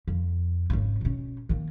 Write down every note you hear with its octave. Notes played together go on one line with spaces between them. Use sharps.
F2
G#1 C#3
B2 C#4
D#3 A#3